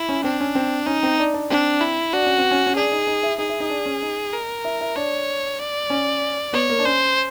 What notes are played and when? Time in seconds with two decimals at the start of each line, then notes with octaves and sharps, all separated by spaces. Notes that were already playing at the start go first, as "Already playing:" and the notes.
Already playing: E4
0.09 C#4
0.24 C4 D4
0.40 C#4
0.55 C4
0.86 C#4 D#4
1.03 C4
1.19 D4
1.34 D4
1.50 C4 D4
1.81 E4
2.13 D4 F#4
2.26 C#4
2.38 C4
2.51 C#4
2.66 C#4
2.76 D4 G#4
2.92 D#4
3.07 D#4
3.23 E4
3.38 D#4 G#4
3.49 E4
3.60 D#4
3.70 D4
3.86 C#4
4.02 D#4
4.33 A#4
4.64 E4
4.81 E4
4.96 D4 C#5
5.59 D5
5.90 C#4
6.53 B3 C#5
6.69 A#3
6.79 D4
6.85 C#4 C5